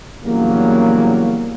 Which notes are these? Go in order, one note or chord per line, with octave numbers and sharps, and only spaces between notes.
A#1 E2 C#3 F#3 G3 A#3